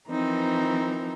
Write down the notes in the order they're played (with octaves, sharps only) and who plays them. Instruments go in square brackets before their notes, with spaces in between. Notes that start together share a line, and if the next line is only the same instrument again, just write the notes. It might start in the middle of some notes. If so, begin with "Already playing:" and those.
[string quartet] E3 F3 C4 D#4 A#4